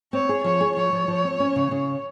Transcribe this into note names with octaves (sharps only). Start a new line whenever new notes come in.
C4 C#5
G#4
F3 C#5
G#4
F3 C#5
F3
F3
C4
C#4
C#3
C#3